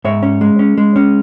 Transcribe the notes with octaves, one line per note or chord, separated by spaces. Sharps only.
G#2 C#5 E5
C#4
G#3
C#4
G#3
C#4